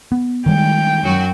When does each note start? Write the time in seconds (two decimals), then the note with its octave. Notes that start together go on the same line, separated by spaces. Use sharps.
0.12 B3
0.46 D#3 G3 G#3 G5
1.02 F#2 F#3 F#4